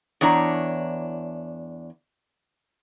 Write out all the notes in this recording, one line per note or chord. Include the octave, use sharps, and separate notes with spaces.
E2 D4 C#5 A#5